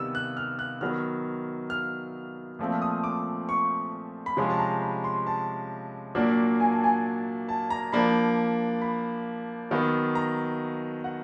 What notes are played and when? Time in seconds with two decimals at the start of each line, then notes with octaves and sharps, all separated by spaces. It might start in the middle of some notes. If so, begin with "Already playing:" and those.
Already playing: C3 D#3 G3 B3 E6
0.15 F#6
0.37 F6
0.59 F#6
0.81 D#3 F#3 B3 F6
1.70 F6
2.59 A#2 F3 A3 C4
2.82 D#6
3.04 D6
3.49 C#6
4.26 B5
4.37 C3 F3 G#3 C#4 C6
4.50 A5
4.59 A#5
4.82 B5
5.04 C6
5.27 A5
6.15 A#2 F#3 A#3 D4
6.60 G#5
6.72 A5
6.84 G#5
7.49 A5
7.70 A#5
7.93 F3 A#3 D4 B5
8.82 B5
9.71 D#3 F#3 B3
10.15 A#5
11.04 F#5